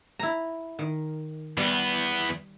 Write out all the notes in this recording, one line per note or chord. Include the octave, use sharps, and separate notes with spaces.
E4 A#5
D#3
E2 G3 B3